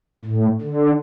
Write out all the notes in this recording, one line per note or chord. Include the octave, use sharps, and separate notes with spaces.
A2
D3